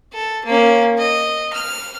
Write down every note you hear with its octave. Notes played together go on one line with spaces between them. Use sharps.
A4
A#3 C#4
D#5
F6